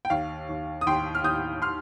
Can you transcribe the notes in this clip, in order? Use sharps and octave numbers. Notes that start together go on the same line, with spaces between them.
G5
D#2 F5
D#2
D#6
D#2 G5 C6
F6
D#2 D#6 G6
C6 F6